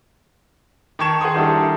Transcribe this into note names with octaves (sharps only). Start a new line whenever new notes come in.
D#3 G5 A5 C#6 G#6 E7
G#4 F#5 G5 C6 D#6
D#3 G3 D4 E4 A4